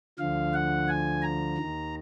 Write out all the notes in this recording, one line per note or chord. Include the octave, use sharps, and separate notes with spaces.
D2 D3 F3 F5
F#5
G#5
A#5
D#2 D#3